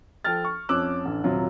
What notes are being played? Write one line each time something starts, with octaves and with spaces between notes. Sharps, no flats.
F3 A4 G5 F6 A6
C#6
F2 F3 C#4 D6 E6 F#6
A1 D3
D#1 C3 F#3 F4